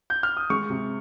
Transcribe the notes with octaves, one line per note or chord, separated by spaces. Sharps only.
G6
F6
D#6
G#3 C#6
C3